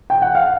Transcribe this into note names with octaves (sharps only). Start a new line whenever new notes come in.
G5
F#5
F5